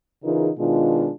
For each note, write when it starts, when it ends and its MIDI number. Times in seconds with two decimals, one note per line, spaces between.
0.24 0.50 49
0.24 0.50 52
0.24 0.50 63
0.24 0.50 65
0.24 0.50 68
0.24 0.50 70
0.58 1.09 47
0.58 1.09 51
0.58 1.09 56
0.58 1.09 62
0.58 1.09 65